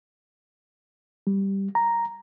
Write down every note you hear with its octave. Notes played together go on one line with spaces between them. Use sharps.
G3
A#5